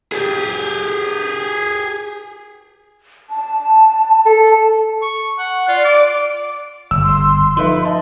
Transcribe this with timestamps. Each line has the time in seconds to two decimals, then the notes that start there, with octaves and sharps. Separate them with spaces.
0.12 G4 G#4
3.30 A5
4.26 A4
5.02 C#6
5.39 F#5
5.68 F4 D5
5.85 D6
6.91 G1 E6
7.03 C6
7.57 F3 D#4 B4 E5
7.85 D#5 E5 A5